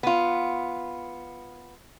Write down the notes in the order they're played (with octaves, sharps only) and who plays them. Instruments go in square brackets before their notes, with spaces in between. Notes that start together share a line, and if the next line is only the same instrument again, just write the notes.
[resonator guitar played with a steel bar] B3 F4